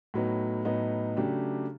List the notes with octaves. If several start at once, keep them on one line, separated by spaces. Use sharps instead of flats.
A2 F#3 B3 D#4
A2 F#3 B3 D#4
C#3 F#3 A3 D4 G4